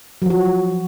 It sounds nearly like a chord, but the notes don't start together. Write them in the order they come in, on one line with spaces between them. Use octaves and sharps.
F#3 F3 F#4